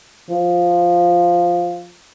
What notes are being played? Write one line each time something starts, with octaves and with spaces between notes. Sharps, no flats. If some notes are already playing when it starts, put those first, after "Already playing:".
F3